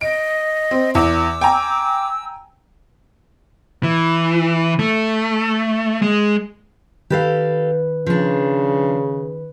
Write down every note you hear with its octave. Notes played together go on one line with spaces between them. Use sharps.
D#5 D7
C4
E2 D6 E6
G5 G#5 A#5
E3
A3
G#3
D#3 G4 A4 B4 F5
C#3 F3 D4